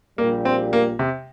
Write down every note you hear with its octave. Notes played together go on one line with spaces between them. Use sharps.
A#1 A#2 G3 A#3
C4
A#3
C3